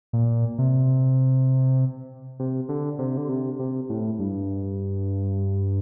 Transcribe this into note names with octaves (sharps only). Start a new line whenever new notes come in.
A#2
C3
C3
D3
C3
D3
C3
C3
A2
G2